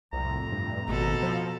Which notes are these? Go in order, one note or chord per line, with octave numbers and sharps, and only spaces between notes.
C2 F2 A2 C3 A#5
G2
G#1 B2 A4
F3